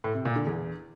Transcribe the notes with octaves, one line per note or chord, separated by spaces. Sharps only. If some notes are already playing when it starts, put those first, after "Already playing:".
A2
C3
A#2
D3
E2